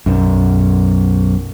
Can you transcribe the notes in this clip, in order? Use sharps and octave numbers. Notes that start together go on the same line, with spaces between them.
B1 F#2